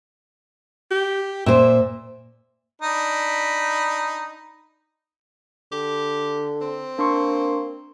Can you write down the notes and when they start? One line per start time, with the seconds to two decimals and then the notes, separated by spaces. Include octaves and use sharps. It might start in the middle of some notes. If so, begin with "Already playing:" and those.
0.91 G4
1.46 A#2 C5 E5
2.82 D4 D#4 B5
5.72 D3 G4
6.61 C4
6.99 A#3 D4 C6 C#6